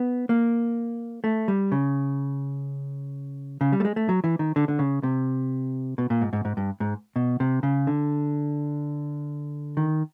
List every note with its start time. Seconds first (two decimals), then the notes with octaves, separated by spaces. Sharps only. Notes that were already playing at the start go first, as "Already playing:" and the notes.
Already playing: B3
0.29 A#3
1.24 A3
1.48 G3
1.72 C#3
3.61 C#3
3.72 G3
3.80 A3
3.85 G#3
3.96 A3
4.09 F#3
4.24 E3
4.39 D#3
4.56 D3
4.68 D3
4.79 C#3
5.03 C3
5.98 B2
6.10 A#2
6.21 G#2
6.33 G#2
6.45 G#2
6.57 G2
6.80 G#2
7.16 B2
7.40 C3
7.63 C#3
7.87 D3
9.77 D#3